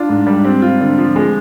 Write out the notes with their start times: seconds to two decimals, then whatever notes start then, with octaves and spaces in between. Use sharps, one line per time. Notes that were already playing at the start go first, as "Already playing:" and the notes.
Already playing: D4 F4
0.09 G#2
0.27 G3
0.44 C4
0.62 F4
0.81 D3
0.98 F3
1.16 G#3